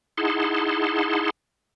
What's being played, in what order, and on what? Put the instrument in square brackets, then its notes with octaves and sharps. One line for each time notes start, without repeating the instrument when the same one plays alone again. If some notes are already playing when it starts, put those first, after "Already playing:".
[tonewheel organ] D#4 E4 G#4 F#5 A5 C6